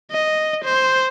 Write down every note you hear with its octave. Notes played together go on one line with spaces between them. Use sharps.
D#5
C5